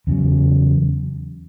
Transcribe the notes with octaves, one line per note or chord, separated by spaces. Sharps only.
E2 C#3 F#3